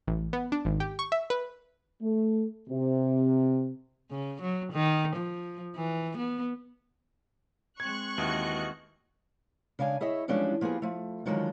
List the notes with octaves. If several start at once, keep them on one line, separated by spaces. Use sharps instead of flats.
A1
B3
D4
G#1
G4
C#6
E5
B4
A3
C3
C#3
F#3
D#3
F3
E3
B3
G#3 C4 C#6 F#6 G#6 C#7
D#2 E3 F#4 D#5
C#3 G#3 D4 F5 G#5
E4 G#4 C#5 D#5 E5
E3 F3 G3 G#3 C#4 D4
F3 A#3 B3 G4 G#4
F3 A3
D3 D#3 F3 F#3 G#3